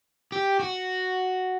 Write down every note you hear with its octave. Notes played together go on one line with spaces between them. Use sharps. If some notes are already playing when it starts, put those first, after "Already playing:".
G4
F#4